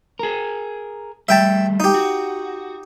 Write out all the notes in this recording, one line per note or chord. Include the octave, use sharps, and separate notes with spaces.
G#4 A#4
G3 A3 E5 G5 A5
D#4 G4
F#4